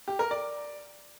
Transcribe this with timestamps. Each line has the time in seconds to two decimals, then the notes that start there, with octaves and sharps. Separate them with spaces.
0.08 G4
0.19 A#4
0.31 D5